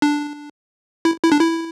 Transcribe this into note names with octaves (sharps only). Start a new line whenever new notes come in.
D4
E4
E4
D4
E4